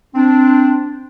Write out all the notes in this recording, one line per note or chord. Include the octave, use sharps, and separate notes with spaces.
C4 D4